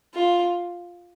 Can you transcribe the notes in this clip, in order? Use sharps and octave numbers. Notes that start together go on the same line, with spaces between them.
F4